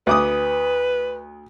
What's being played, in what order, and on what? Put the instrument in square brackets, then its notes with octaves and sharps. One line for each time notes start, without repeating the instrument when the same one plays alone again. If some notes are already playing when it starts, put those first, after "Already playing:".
[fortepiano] D2 D6 D#6 [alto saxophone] B4